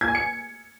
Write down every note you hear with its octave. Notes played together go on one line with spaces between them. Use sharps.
G#6
G#5
C#7